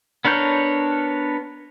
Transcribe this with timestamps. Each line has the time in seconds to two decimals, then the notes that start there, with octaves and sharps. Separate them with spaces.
0.25 B3 D4 A#4 C#5 G6